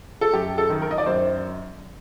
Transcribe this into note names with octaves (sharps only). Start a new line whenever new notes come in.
A4
F#2 G4
A4
D#3
A#4
D#5
D5
F#2 C5